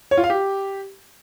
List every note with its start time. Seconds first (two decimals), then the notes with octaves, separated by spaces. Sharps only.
0.11 C#5
0.17 F4
0.24 F5
0.30 G4